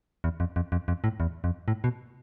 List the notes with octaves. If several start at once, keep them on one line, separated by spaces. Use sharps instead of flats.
E2
F2
F2
F2
F2
A2
E2
F2
A2
B2